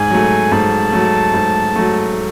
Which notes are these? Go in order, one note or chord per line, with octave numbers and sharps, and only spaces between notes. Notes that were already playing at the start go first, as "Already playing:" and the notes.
Already playing: G#2 G#5
F#3 A3
G#2 A5
F#3 A3
G#2
F#3 A3